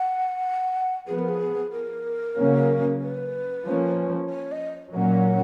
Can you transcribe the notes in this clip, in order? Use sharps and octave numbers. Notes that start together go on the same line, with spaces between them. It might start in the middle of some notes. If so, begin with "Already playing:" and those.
Already playing: F#5
F3 B3 G#4
A#4
G#4
A#4
C#3 F#3 A#3 C#4
B4
F3 A#3 C#4
C#5
D#5
A#2 F#3 A#3 C#4 F#5